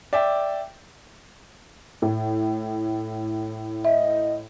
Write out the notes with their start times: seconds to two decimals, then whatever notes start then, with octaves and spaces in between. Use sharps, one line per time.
0.13 D5 E5 G5
2.02 A2
3.85 D#5 E5